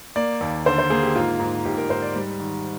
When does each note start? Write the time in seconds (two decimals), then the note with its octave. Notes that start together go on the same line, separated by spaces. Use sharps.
0.16 A#3 D5
0.41 D#2
0.66 D3 C5
0.79 C5
0.90 A#3 G#4
1.03 G4
1.15 G#2 F4
1.40 G#2
1.65 G#2 G4
1.77 A#4
1.89 G#2 C5
2.02 D5
2.15 G3
2.40 D#3